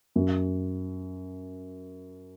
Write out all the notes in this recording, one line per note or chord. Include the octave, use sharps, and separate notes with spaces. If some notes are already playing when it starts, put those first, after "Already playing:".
F#2